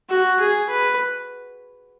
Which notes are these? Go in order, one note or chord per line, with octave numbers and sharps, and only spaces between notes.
F#4
G#4
B4